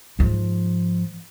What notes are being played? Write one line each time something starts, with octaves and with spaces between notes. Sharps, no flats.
G#2 F3